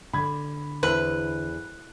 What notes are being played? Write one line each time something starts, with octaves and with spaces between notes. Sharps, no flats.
D3 B5 G#6
E2 B4 C5